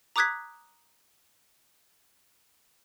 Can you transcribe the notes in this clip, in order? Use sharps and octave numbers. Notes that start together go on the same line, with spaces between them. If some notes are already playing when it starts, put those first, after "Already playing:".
A#5 D6 D#6 F#6 G#6 B6